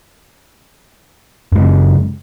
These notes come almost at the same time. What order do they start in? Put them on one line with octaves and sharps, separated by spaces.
F#2 G#3 C#3